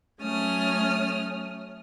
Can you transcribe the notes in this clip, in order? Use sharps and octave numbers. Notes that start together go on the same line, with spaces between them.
F#3 A3 C#4 D#6 F6